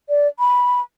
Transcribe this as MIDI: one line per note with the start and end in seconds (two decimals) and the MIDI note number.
0.09 0.27 74
0.39 0.81 83